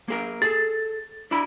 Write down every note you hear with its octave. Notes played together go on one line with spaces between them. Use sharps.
A#3 G#4 A#4
G#4 A4 A6
D4 E4 B5